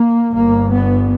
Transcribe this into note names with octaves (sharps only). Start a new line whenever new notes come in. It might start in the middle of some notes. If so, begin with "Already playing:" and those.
Already playing: A#3
G1 G2 A#3
B3